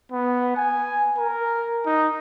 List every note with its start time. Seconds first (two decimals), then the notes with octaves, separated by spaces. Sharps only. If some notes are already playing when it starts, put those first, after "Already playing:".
0.12 B3
0.56 G#5
1.18 A#4
1.86 D#4